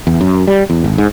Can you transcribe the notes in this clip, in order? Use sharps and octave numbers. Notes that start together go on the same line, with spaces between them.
E2
F#2
G3
E2
G#1
G#2